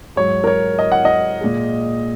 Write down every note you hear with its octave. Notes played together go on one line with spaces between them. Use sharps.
G#2 F#3 C#5
A#4
C#5
D#5
F#5
D#5
A#2 G#3